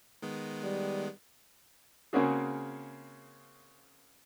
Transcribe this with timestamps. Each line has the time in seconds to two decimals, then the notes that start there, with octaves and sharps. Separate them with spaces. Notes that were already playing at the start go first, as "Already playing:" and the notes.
0.22 D#3 G#3 B3
0.63 G3
2.13 C#3 A#3 C4 C#4 F#4 G#4